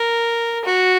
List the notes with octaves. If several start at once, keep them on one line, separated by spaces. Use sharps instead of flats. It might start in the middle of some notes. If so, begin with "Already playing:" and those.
Already playing: A#4
F#4